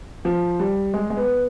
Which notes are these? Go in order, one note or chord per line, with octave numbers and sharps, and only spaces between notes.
F3
G3
G#3
G#3
B3